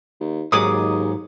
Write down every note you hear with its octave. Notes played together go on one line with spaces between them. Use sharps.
D#2
D#2 G#2 F#3 G#4 D6 D#6